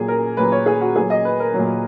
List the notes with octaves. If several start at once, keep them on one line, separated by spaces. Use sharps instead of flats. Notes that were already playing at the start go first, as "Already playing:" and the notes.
Already playing: A#2 F#3 G#4
A#4
A#2 F#3 B4
C#5
G#4
F#4
A#2 F#3 G#4
D#5
B4
A#4
A#2 F#3